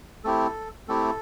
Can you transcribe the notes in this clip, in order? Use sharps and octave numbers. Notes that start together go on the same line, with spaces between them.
A3 C4 E4 G4 A4
A3 C4 E4 G4 A4